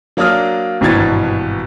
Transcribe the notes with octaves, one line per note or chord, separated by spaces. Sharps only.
F#3 A#3 D4 D5 D#6 F6
G#1 G2 B2 E3 G#6 A6